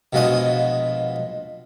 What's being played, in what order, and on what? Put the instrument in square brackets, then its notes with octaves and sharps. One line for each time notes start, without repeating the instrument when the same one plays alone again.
[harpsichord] A#1 B2 F3 G#3 F#5 D#6